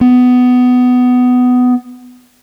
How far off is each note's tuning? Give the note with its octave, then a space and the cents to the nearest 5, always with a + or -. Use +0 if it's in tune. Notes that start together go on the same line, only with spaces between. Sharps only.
B3 +15